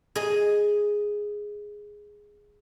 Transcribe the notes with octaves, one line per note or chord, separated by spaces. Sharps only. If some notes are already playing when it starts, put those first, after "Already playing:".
G#4 D#5